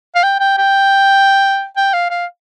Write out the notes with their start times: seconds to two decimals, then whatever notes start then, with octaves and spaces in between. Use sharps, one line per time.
0.15 F5
0.23 G5
0.40 G5
0.58 G5
1.77 G5
1.93 F5
2.10 F5